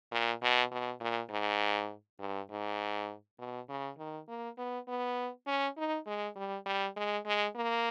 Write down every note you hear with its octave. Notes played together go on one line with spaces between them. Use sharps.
A#2
B2
B2
A#2
G#2
G2
G#2
B2
C#3
D#3
A#3
B3
B3
C#4
D#4
G#3
G3
G3
G#3
G#3
A#3